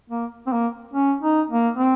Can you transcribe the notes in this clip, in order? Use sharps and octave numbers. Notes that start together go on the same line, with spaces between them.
A#3
C4
A#3
C#4
D#4
A#3
C4